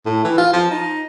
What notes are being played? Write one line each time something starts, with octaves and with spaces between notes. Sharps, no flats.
A2
E3
F4
F3
D#4